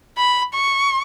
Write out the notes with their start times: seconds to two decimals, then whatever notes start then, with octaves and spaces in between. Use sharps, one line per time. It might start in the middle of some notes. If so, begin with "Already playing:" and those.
0.18 B5
0.54 C#6